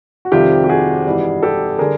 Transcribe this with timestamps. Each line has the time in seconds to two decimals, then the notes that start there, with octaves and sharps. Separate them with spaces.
0.25 F#4
0.32 F2 C3 D#3 G3 F4 G4
0.64 G4
0.69 F#4 G#4
1.06 G#1 G2 E3 G3
1.43 G4 A4
1.79 D3 G3 G#4 A#4